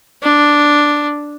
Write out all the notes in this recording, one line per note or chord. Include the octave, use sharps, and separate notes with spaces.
D4